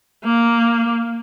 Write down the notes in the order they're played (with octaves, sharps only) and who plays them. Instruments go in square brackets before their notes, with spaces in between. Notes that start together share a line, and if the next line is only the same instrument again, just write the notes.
[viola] A#3